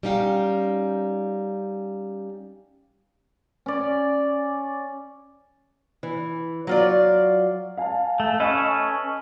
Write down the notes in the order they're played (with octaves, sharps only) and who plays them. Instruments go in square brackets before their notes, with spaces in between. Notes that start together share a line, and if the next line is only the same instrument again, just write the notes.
[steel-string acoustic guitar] G3 C#4 D#4 F5 G5
[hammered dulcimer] C#4 D5
[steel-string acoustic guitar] E3
F#3 F4 D5
[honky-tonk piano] F5 G#5 A5
[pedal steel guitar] A3
[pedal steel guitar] C#4 A4 B4 [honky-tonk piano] D#5 G#5 C#6